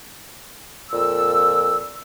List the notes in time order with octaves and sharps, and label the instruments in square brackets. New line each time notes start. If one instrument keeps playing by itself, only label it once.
[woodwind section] F2 A#2 E6